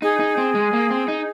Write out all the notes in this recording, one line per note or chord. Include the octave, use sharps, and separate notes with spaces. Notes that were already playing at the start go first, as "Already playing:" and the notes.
D#4 G#4
D#4
C4
G#3
A#3
C4
D#4